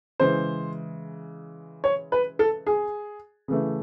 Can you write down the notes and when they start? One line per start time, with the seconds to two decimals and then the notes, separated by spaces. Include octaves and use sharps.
0.20 C#3 E3 G#3 C5
1.84 C#5
2.12 B4
2.39 A4
2.67 G#4
3.48 C#3 E3 A3